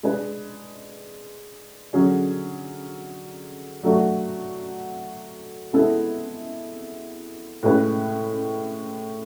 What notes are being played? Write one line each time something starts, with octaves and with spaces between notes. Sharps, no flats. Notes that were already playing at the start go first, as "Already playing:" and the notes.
G#3 D4 G#4 B4
D3 F#3 C#4 G#4
F#3 A3 D4 F#4
G#3 B3 E4 A4
A2 G#3 C#4 G#4 B4